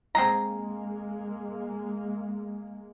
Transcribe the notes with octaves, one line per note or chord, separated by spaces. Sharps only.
G#3 A#3 C4 G#4 A#5